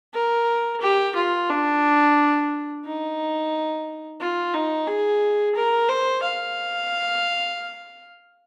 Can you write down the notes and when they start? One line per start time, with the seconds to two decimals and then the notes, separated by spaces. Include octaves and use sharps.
0.14 A#4
0.81 G4
1.15 F4
1.49 D4
2.85 D#4
4.20 F4
4.54 D#4
4.88 G#4
5.56 A#4
5.89 C5
6.23 F5